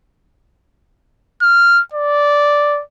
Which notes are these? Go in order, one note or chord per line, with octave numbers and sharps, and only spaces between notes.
F6
D5